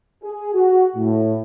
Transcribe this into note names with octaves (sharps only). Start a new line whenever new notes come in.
G#4
F#4
A2